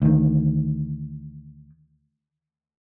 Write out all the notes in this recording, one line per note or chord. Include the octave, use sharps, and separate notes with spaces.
D2 D#3